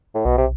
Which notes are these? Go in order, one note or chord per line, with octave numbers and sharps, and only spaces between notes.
A2
B1 B2
C3